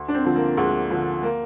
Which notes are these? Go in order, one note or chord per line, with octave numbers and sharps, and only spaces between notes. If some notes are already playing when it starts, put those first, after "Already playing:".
Already playing: D2
D4
C4
D3 F3
A#3
D2 G#3
D3 F3
A#3